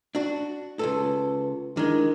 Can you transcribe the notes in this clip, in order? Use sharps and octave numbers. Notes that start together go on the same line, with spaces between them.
D4 F#4
C#2 G#2 A4 B4
D#3 G#3 D4 E4 A#4